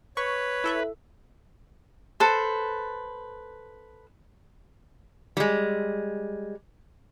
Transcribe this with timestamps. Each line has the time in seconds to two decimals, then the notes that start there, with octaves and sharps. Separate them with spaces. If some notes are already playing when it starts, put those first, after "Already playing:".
0.17 B4 C#5 C#6
0.64 E4 A4 E5
2.20 A4 B4 C5
5.37 G3 G#3